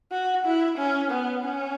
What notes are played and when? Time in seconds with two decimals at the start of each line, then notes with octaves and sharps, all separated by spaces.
0.12 F#4
0.45 E4
0.78 C#4
1.11 B3
1.44 C#4